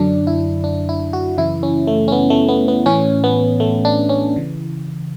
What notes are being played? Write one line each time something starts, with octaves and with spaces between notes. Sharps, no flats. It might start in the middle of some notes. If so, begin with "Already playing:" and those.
Already playing: F#2 D3 F#3 D4
E4
D4
E4
F#4
F#2 C#3 E3 E4
C#4
A3
C#4
B3
A3
B3
B3
A2 E3 C#4
B3
A3
D4
C#4
C#3 E3